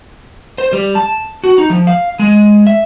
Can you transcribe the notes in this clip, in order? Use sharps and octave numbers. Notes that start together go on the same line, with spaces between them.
C5
G3
A5
F#4
D#4
F3
F5
G#3
E5